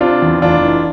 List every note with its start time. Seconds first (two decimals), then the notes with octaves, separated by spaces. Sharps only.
0.01 C3 D4 F4
0.22 E2
0.42 F1 D4 F4
0.63 E3